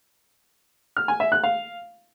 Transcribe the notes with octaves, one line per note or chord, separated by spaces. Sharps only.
F6
G#5
E5
F#6
F5